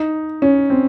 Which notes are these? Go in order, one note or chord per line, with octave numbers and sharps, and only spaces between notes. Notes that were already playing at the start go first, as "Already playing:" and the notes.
Already playing: D#4
C#4
C4